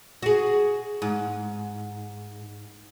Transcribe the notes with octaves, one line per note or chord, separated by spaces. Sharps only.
F#4 G#4
G#2